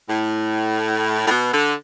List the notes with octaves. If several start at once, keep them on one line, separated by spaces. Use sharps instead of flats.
A2
A2
B2
D3